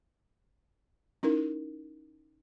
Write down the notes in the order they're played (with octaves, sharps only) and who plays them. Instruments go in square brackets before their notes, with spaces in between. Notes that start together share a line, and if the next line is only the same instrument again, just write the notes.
[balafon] C#4 D#4 E4 A#4